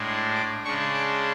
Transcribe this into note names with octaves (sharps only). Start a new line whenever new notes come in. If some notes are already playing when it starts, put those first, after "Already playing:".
Already playing: A2 G#3 D4
D6
C#3 G#3 D4 C#6
D6